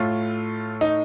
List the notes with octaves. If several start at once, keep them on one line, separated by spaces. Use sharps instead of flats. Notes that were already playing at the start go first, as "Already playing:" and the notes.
Already playing: A2 A3 F4
D#4